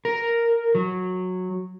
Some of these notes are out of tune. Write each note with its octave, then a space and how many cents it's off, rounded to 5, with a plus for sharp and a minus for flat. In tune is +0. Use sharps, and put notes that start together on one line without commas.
A#4 +0
F#3 -10